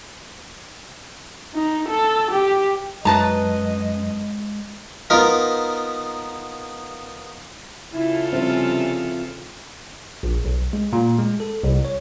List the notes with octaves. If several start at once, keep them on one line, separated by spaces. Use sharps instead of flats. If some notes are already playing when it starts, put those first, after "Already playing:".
D#4
A4
G4
F#2 G#3 B4 D#5 A5 A#5
B3 D#4 F4 A#4 A#5
C#3 E4 F4 A4
C3 F3 G3 C4 C#4 E4
A#1
B1
G#3
A#2
G#3
A4
C2
C#5